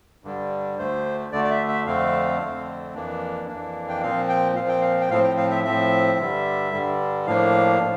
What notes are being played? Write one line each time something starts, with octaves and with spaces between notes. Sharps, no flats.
G2 D3 G3
D2 D3 A3 C5
D2 D3 A3 D5
D5
E5
E5
F2 D3 A3 C4 F5
F2 D3 A3 C4
F2 E3 A#3 D4
F2 E3 A#3 D4
G5
A#2 F3 C4 F5
G5
A#2 F3 C4 F5
G5
F5
G5
A2 F3 C4 F5
G5
F5
E5
A2 F3 C4 E5
G2 D3 G3
G2 D3 G3
A2 F3 A#3 D4 F5
A2 F3